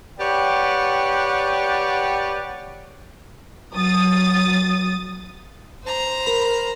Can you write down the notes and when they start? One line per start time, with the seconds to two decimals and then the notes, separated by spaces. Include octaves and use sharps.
0.19 G4 B4 C#5 D5 F#5 G5
3.75 F#3 D#6 A6
5.84 C5 A#5
6.26 A#4 B5